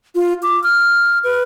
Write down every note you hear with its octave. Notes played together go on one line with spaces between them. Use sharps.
F4
D6
F6
B4